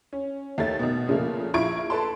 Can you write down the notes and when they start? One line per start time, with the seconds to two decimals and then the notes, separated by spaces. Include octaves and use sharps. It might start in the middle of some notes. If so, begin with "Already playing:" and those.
0.13 C#4
0.58 D#2 A3 C#5 A6
0.79 B2 D#3
1.08 A#2 C#3 F3 A3 A#3
1.54 A#1 E4 F4 C#6 G#6 D7
1.90 A4 B4 A5 C6